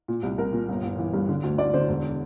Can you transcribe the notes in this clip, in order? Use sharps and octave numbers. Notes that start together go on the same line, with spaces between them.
A#2
C2
C2 A#4
A#2
G1
G1
E3
G2
D3
D2
D2 D5
D3 C5
E1